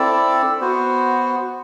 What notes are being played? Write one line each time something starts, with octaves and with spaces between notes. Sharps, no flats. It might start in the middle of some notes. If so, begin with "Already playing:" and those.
Already playing: C4 E4 A4 D5
B3 F#4 C5